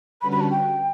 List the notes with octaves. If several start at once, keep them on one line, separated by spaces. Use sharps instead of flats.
D3 G3 C#4 F#4 B4 B5
B5
A5
G5